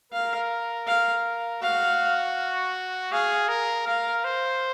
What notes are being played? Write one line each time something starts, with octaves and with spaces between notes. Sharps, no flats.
A#4 F5
F5
F#4 F5
G#4 F5
A#4
A#4 F5
C5